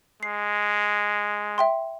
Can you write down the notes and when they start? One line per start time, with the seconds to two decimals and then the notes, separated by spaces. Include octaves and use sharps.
0.23 G#3 C7
1.58 E5 G5 C6